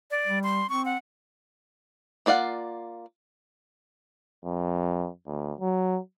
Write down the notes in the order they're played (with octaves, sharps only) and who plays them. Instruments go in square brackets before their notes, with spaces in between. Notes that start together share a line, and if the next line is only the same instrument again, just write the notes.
[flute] D5
[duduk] G3
[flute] C6
[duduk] C4 [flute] C#6
[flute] F#5
[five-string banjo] A#3 F4 D5 F5 F#5
[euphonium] F2
D2
F#3